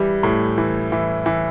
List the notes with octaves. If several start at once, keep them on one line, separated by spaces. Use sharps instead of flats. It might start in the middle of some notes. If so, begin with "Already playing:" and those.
Already playing: E3 G3
A2
E3
E3
E3